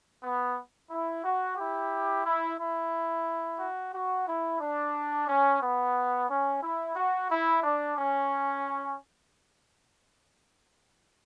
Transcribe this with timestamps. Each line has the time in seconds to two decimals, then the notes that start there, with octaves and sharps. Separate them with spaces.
0.23 B3
0.91 E4
1.24 F#4
1.57 E4 G4
2.25 E4
2.59 E4
3.59 F#4
3.93 F#4
4.27 E4
4.60 D4
5.28 C#4
5.62 B3
6.28 C#4
6.63 E4
6.96 F#4
7.30 E4
7.63 D4
7.97 C#4